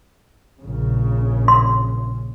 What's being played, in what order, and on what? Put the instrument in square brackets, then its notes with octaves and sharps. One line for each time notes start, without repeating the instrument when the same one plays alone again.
[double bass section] A#1 C#3
[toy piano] C6